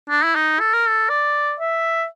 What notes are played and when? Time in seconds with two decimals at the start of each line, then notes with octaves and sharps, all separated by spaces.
0.09 D4
0.24 E4
0.35 D#4
0.60 A4
0.73 A#4
0.88 A4
1.09 D5
1.60 E5